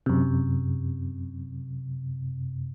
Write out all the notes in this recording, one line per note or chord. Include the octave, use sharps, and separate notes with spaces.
F#2 C3